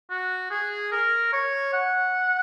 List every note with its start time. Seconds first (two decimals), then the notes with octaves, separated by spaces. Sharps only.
0.10 F#4
0.51 G#4
0.92 A#4
1.33 C#5
1.73 F#5